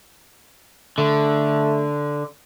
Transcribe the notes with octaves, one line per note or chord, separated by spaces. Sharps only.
D3 A3